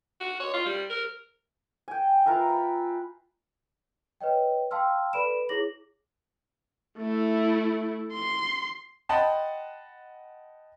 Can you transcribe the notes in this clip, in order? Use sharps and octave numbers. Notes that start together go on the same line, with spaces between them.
F#4
C#5
F4
G3
A#4
G5 G#5
F4 A#4 B4 E5
B5
B4 C#5 D#5 G5
F5 G5 A5 C6 E6 F6
A4 B4 D5 B5 D7 E7
E4 G#4 C#5 D6 A#6 F#7
A3 E4
C6
D#5 F#5 G5 A5 B5 C6